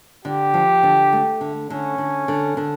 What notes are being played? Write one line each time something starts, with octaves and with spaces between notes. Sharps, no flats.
D3 G4
F3
D3
A3
D3
D3 C#4
D3
D3
D3